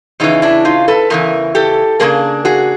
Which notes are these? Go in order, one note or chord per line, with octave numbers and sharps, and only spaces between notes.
E2 C#3 E3 D#4
D4 E4
D#4 F4
A4 B4
E2 C#3 E3 A#4
G4 A4
C#3 F#3 A#3 D4 G#4 A#4
F#4 G#4